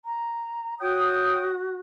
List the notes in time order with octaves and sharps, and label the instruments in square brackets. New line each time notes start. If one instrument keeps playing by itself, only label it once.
[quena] A#5
[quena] F#4 [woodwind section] C#5 G5 D#6